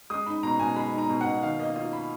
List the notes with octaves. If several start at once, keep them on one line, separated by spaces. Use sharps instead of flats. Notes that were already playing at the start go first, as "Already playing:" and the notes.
G#3 D#6
D#4 B5
B2 A#5
B2 G#5
G#3 B5
D#4 A#5
B2
F#5
B2
D#3 F5
A#3 D#5
F4 D#5
B5